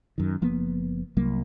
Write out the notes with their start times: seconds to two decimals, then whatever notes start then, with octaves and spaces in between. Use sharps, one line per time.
0.18 F#2 D#3
0.41 F#1 F3 A#3 B3
1.17 C2 F#3 G3 A#3